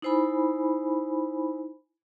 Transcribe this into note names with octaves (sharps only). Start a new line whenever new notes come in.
D#4 E4 C5 G#5 B5